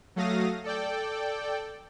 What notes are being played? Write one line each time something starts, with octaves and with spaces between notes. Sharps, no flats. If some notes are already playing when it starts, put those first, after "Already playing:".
F#3 A3 F5 D#6 A#6
A4 D5 G5